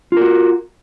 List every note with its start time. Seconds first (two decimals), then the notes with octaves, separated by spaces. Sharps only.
0.12 F4
0.17 A#4
0.21 F#4